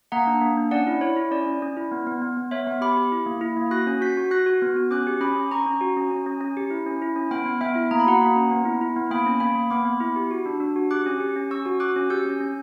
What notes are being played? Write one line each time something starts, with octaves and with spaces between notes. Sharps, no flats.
A#3 F#5 A#5
D4
A#3
D4
C#4 D5 F#5
E4
E4 C#5
E4
C#4 D5
C#4
C#4
E4
B3
B3
B3
B3
B3 C#5 E5
B3
G4 B5 D6
G4
E4
A#3
E4
A#3
F#4 F#6 A#6
C#4
F#4 G6 B6
F#4
F#4 F#6 A#6
F#4
B3
F#4
C#4 D6 F#6
G4
C#4 B5 D6
C#4
C#4 A#5 C#6
C#4
F#4
C#4
C#4
C#4
C#4
G4
E4
C#4
E4
C#4
B3 G5 B5
B3
B3 E5 G5
E4
A#3 A#5
B5
F#4 F#5 A#5
A#3
C#4
B3
E4
E4
B3
A#3 G5 B5
C#4
A#3 G5 B5
A#3
B3 B5 D6
B3
E4
G4
F#4
D4
D4
F#4
G4 D6 F#6
C#4
G4
C#4
C#4 C#6 E6
F#4
F#4 D6 F#6
C#4
G4 E6 G6
C#4
C#4